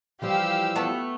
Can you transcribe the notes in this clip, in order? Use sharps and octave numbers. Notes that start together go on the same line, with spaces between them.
E3 F3 G3 G4 F5 E6
A3 B3